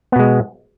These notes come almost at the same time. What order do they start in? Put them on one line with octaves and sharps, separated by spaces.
B3 B2 G#3